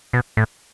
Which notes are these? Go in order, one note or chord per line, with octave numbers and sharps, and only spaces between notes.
B2
A2